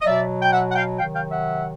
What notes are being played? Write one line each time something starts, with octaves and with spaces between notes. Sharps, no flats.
D#5
B2 F#3 D5 E5
G5
E5 F#5
F#5
F5 G5
C3 D#3 F#3 F5 G5
F5 G5
E5 F#5